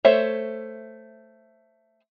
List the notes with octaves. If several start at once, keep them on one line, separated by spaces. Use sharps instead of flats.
A3 C5 C#5 E5